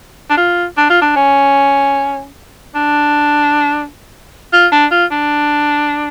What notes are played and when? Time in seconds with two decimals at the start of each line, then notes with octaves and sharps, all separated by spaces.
0.30 D4
0.38 F4
0.78 D4
0.90 F4
1.02 D4
1.16 C#4
2.75 D4
4.53 F4
4.72 D4
4.91 F4
5.12 D4